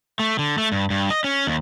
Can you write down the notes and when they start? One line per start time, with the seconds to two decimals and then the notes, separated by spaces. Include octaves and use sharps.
0.19 A3
0.39 D3
0.58 A3
0.72 G2
0.90 G2
1.11 D#5
1.24 C#4
1.47 D#2